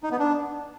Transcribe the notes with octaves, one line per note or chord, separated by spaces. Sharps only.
D#4
B3
D4